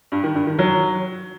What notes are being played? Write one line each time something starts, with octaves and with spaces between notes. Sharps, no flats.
G2
D#3
G2
D#3
F#3